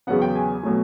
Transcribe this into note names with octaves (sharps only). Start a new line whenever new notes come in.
E2 C#3 F#3 B3 F#5
G5
G#5
B2 F#3 A3